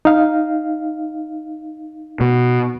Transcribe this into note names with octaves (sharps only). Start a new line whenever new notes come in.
D#4 F5
B2